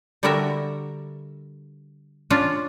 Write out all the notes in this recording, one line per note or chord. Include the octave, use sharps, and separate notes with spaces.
D3 G3 E4 F#4 A#4 E5
C#4 D4 F4